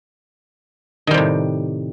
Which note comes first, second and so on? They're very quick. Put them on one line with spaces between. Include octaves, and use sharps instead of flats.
D#3 G3 C3 A2